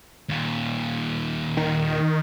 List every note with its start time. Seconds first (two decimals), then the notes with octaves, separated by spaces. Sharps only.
0.29 D#2 A#2
1.57 D#3